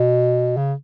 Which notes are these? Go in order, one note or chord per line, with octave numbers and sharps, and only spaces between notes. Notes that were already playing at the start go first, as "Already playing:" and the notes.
Already playing: B2
C#3